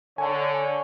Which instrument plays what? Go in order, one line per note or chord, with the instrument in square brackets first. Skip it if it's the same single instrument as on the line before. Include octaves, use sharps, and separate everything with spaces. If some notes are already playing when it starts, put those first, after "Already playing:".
[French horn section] D3 [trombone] C#5 [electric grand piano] G#5